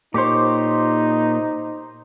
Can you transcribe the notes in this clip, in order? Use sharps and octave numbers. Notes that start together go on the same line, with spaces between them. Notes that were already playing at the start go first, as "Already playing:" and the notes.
A#2 D#4 G4 C5 C#5 D6